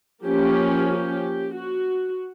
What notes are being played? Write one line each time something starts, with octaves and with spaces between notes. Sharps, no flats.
F3 A#3 C#4 G4
G4
F#4